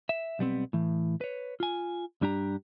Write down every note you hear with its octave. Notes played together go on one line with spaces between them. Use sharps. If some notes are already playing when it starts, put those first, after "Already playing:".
E5
B1 G3 B3 C4
A2 E3
B4 C#5
F4 G#5
G2 G3 D4 G4 A#5